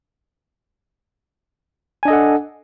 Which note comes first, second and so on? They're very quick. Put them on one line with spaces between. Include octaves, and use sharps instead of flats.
G#5 D4 D#5 A4 F#5